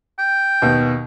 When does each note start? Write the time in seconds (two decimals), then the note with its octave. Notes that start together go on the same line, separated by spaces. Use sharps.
0.19 G5
0.62 D#2 B2